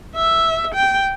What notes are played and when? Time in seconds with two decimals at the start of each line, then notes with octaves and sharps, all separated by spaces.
0.16 E5
0.75 G5